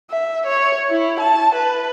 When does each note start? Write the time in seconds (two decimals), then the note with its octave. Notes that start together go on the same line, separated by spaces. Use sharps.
0.11 E5
0.46 C#5
0.90 E4
1.20 A5
1.55 B4